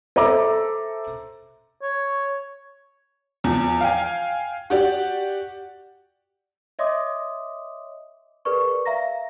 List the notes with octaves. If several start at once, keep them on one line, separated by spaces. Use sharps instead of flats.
A4 C5 E5 A#5 D6
C#5
E2 F3
F5 G5 G#5
F#4 G4 D5
C#5 D#5 E5 C6 D6 D#6
G#4 A#4 B4 D5 C#6
E5 F5 A#5 A#6